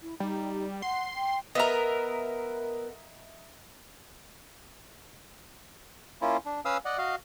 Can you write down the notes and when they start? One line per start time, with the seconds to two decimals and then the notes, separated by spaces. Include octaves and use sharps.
0.02 E4
0.20 G3 D#4
0.82 F#5 C6
1.15 G5
1.55 B3 A#4 D#5 E5 A#5
6.22 A#3 C#4 E4 F4
6.45 D4
6.65 C#4 B4 F5 D#6 E6
6.85 D5 D#5 F#5
6.98 F#4 D#5 F5